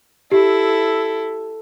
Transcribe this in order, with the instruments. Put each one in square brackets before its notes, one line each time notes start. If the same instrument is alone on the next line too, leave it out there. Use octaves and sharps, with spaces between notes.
[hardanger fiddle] E4 A4 [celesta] G4